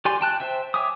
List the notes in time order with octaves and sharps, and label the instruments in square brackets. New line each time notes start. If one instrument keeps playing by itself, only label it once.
[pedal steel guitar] G4 D5 G#5 C6
G5 A5 F#6
C5 E5 G5
C#5 E5 G#5 D6 D#6